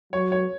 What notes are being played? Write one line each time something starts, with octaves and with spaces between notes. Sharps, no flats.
F#3 C#5
C#5